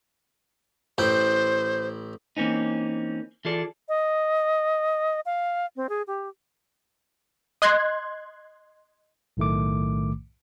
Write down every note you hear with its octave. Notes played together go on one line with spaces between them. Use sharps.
A1 E4 C5 G5
E3 A#3 C4 C#4 D#4
E3 F4 G#4 A4 D5
D#5
F5
C4
G#4
G4
D#5 C6 F#6 G#6
B1 A2 D#3 A3 D6